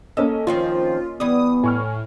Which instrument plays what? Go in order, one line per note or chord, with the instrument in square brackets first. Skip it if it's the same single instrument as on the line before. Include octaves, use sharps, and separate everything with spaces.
[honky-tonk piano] A#3 C#4 D#5 [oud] A4
[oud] D#3 F3 C4 [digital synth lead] F4
[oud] E3 G3 D5 [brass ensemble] B3 [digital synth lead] D#6
[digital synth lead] A2 [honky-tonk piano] G#5 C#6 F6